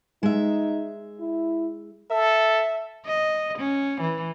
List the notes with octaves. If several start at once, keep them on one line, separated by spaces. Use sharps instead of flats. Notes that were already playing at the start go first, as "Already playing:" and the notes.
G#3 D#4 E5
E4
A4 E5
D#5
C#4
E3